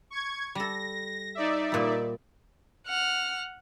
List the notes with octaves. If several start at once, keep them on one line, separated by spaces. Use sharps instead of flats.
C#6 G#6
G3 A4 A#6
D#4 D5 E5
A#2 G3
F#5 F6